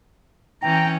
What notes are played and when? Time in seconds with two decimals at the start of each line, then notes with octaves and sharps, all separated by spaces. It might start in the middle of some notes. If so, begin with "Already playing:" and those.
0.62 E3 C#4 G5 A#5